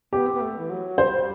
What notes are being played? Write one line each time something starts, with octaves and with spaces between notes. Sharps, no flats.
B3 G4
C4
B3
A3
E3
F#3
G3 C5